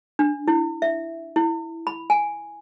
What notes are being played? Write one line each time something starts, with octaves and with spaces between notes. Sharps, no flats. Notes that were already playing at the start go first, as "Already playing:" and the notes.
D4
E4
E5
E4
B5
G#5